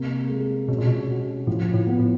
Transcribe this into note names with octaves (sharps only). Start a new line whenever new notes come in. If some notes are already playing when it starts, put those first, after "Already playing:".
Already playing: C3 A#3
G#3
B2 C#4
A#2
B2
F#4
A2 F3
A2
B3
A2